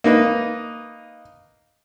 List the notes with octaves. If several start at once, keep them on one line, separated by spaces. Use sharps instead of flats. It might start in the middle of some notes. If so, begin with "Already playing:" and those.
A#3 D#4 B4